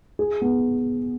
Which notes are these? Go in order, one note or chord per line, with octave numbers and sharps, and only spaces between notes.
G#4
B3